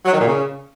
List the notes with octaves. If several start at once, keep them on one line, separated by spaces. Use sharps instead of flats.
F#3
D#3
A#2
C#3